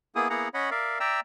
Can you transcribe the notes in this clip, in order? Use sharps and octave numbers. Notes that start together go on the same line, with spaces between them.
A#3 B3 E4 G#4 D#6
A#3 B3 E4 G#4 F#5 A#5
C#4 C#5 D#5 F#5 B5
A#4 D5 E5 F5
D5 E5 G5 A#5 E6